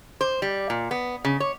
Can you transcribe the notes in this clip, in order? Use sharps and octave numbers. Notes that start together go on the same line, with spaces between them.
C5
G3
A#2
B3
C#3
C#5